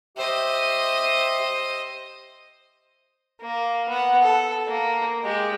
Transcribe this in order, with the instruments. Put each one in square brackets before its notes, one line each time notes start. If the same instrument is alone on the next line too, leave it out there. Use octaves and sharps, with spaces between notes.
[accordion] G4 E5 [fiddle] C5 D#5
[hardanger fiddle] A#3
B3 F#5
A4
A#3
G#3 G4